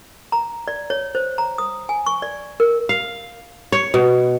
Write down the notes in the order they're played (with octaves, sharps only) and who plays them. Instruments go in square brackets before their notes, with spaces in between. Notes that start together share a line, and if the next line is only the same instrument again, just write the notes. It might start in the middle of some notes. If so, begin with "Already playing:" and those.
[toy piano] A#5
D5
C#5
C5
A#5
D#6
G#5
C#6
D5
A#4
[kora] F5
C#5
B2